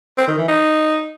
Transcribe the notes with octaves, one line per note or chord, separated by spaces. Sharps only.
C4
D#3
E3
D#4